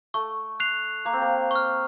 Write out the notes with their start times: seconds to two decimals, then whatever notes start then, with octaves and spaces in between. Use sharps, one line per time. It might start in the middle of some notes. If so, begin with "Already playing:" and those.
0.14 A3 C#6
0.60 F#6 C7 F7
1.05 A#3 A#5
1.13 C4
1.22 A#3
1.51 C#6 F6